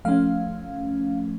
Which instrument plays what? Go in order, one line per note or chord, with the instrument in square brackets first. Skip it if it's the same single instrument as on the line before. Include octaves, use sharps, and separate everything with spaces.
[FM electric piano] F3 A3 C#4 F5